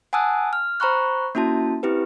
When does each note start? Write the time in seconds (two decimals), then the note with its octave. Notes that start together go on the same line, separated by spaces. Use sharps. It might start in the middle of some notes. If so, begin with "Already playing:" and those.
0.13 F#5 G#5 A5 D#6 E6 F#6
0.53 F6
0.80 C5 A#5 B5 C#6 F#6
1.35 A#3 C#4 E4 F#4 A5
1.83 C4 E4 G4 B4